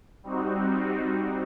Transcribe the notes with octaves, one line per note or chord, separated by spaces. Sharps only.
G3 C4 D#4 F#4